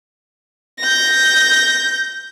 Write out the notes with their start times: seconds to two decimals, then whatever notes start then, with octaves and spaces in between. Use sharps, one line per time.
0.80 G6 A#6